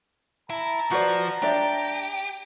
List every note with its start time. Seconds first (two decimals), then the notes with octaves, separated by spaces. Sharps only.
0.50 E4 A5 A#5
0.91 F3 F#4 B4 D5
1.42 D4 G4 D5 E5